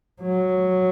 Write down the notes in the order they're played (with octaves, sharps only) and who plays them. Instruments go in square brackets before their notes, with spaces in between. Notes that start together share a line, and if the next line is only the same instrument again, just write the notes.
[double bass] F#3